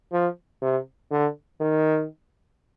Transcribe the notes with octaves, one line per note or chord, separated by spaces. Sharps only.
F3
C3
D3
D#3